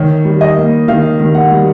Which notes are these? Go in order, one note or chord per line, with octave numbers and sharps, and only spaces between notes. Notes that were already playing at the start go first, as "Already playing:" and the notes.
Already playing: D#3 C#5
G3
D#5
A#3
D#3 F5
D#3
F#5
G3